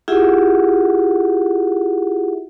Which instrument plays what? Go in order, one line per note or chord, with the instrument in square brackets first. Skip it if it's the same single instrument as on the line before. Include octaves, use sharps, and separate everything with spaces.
[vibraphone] E4 F4 G4 G#4 E5 F#5